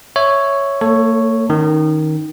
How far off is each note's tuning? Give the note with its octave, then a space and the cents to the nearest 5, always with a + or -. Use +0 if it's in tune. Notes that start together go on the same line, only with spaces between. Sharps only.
C#5 +0 E5 +0
A#3 -40 A4 +15 C#5 +0
D#3 +0 C#4 +0